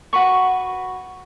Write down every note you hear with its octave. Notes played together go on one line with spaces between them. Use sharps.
F#4 B4 B5 C#6